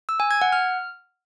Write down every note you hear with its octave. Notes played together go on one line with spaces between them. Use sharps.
E6
G#5
G#6
F#5
F6